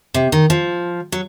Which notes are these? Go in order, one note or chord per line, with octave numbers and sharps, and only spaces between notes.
C3
D#3
F3
F#3